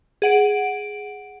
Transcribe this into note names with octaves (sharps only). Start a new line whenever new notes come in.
G#4 F#5 D7